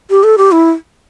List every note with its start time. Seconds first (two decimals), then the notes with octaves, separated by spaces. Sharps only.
0.10 G4
0.24 A4
0.38 G4
0.52 E4